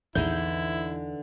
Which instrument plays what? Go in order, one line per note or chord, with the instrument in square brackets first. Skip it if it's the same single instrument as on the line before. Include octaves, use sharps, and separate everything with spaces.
[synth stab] A#1 G6 [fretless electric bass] E2 [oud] D3 E3 D#4 [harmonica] E4